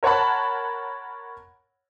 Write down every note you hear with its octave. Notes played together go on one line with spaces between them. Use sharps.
A#4 C#5 F#5 A5 B5